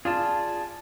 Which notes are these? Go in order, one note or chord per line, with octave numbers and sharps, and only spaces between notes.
F4 G#4 D5 A5